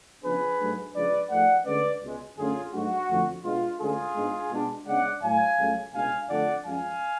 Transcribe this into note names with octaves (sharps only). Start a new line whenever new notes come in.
C#3 F3 B3 D4 G#4 B4
G#2 F#3 A3 D4
C#3 F3 G#3 D4 B4 D5
G#2 F3 A3 D5 F#5
D2 D3 G#3 C#4 B4 D5
C#2 B2 G#3
F#2 D3 F#3 A3 C#4 F4 G#4
G#2 F#3 A3 D4 F#4
F2 D3 F3 A3 D4
B2 G#3 D4 F4
D2 D3 G#3 C#4 F4 G#4
G#2 G#3 B3 D4
B2 G#3 B3 D4
C#3 G#3 B3 D4 D5 F#5
A2 F#3 A3 F5 G#5
C#2 C#3 F#3 A3
C#2 B2 G#3 D4 F5 G#5
F2 D3 F3 A3 D4 D5 F#5
F#2 F3 G#3 C#4 F5 G#5